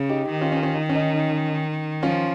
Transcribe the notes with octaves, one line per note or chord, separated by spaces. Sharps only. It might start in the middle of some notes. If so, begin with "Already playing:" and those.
Already playing: C#3
D#4 G4
D#3
C#4 F4
C#4
C#4
D#4
C#4
D#4
F3 C#4 F4